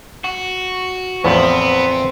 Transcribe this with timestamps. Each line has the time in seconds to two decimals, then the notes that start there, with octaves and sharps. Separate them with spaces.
0.24 F#4
1.24 E2 A2 F3 B3 C4